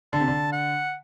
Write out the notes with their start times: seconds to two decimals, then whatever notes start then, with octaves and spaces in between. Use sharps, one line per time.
0.13 D3 A5
0.20 C3
0.28 D3
0.53 F#5